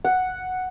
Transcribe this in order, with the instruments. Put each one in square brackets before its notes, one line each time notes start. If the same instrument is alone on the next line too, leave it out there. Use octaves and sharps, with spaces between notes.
[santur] F#5